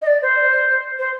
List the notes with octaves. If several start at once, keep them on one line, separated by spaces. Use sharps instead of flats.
D#5
D5
C5
C5